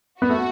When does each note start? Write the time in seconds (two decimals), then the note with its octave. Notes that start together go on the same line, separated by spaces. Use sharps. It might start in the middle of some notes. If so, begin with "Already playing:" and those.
0.21 B3 F#4
0.30 A3